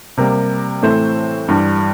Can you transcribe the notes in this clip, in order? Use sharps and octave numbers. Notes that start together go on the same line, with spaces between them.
C3 G3 A#3 A#4
A2 E3 A3 C4 C5
G2 E3 G3